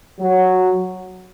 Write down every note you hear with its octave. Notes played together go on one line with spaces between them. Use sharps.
F#3